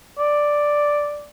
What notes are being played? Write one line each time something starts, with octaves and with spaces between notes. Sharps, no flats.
D5